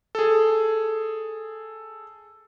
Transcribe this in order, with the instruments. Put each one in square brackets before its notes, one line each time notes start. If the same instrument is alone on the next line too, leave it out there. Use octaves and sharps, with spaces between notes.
[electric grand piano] G#4 A4